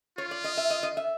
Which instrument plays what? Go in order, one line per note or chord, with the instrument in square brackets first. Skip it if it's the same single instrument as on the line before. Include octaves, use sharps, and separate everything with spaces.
[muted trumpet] F4 [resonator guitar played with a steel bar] C#5
[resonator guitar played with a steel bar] D5
D#5
E5
D#5
D#5
E5